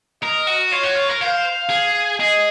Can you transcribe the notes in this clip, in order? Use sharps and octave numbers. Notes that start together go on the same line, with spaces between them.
A#4 D#5
F#4
F4 C#5
F#4
F4
A#4
C5 F5
G#4
G#4 D#5